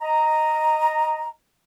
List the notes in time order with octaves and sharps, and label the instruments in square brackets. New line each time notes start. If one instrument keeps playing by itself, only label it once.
[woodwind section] D#5 A#5